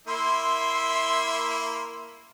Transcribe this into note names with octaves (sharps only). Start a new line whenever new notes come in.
A#3 E4 E5 C6